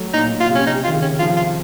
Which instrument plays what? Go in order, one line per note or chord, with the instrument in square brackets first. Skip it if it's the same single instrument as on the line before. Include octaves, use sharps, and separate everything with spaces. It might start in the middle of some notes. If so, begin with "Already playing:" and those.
Already playing: [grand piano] F#3 A3
[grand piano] A#2 [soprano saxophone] D#4
[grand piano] A#2
[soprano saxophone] F4
[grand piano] C3
[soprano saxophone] C#4
[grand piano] C3 [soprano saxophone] D#4
[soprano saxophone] F4
[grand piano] D#3
C#3
[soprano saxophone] C#4
[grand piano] F3 [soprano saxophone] F4
[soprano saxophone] F4